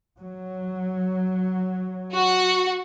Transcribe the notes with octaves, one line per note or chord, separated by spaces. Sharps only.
F#3
F#4